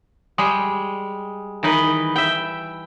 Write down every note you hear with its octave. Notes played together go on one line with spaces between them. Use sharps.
G3 G#3 G#4
D#3 E3 D#4 B4 D#5
E5 G5